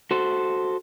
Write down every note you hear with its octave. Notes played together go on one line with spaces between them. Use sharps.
F#4 A4 C5